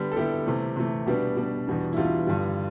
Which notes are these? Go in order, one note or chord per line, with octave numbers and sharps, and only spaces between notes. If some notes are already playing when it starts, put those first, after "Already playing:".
Already playing: D3 G3 B3
A4
D3 G3 B3 E4 G4
C3 E3 A3
C3 E3 A3
B2 G3 B3 D4
B2 G3 B3 D4
E2 B2 G3 D4
E4
E2 B2 G3 D4 F4
G2 D3 G3